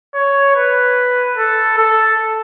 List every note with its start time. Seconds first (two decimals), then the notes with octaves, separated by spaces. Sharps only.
0.14 C#5
0.55 B4
1.37 A4
1.78 A4